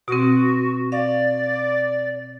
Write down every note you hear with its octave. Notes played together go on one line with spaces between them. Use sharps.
B2 C4 F#4
D5 F5